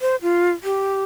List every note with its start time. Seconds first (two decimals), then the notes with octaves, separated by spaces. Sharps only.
0.01 C5
0.22 F4
0.64 G4